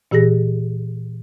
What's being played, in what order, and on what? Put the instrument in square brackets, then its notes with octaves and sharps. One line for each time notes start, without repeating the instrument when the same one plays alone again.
[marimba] A#2 E3 G4 G#4 A#6